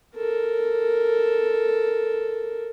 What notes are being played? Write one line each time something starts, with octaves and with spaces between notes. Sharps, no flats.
A4 A#4